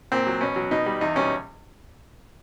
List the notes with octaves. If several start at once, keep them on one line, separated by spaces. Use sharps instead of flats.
A#2 C4
F#3
B2 C#4
F#3
B2 D#4
G3
E2 D#4
B2 G3 C#4